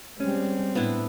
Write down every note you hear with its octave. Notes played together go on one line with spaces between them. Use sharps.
G3 G#3 C4 C#4
A2 B3 D4 E4